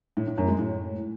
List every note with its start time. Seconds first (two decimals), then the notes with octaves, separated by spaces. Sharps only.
0.17 A2
0.27 A2
0.38 F#2
0.48 G#3
0.59 A2